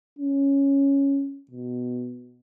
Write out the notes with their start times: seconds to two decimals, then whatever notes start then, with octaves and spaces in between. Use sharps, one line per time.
0.19 C#4
1.51 B2